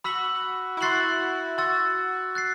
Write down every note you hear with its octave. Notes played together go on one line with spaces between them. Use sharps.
F#4 B5 E6 B6 F#7
E4
F#4 C6 F#6 A6 C7 F#7
F#4 C6 E6 A6
F#6 A6 C7